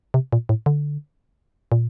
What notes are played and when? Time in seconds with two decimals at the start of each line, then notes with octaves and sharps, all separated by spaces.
0.14 C3
0.33 A#2
0.49 A2
0.66 D3
1.72 A#2